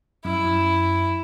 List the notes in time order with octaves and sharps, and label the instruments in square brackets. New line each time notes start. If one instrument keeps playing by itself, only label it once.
[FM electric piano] F#2 [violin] E4
[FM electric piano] F#2